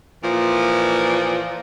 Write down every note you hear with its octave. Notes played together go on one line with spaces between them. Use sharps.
A#2 E3 F3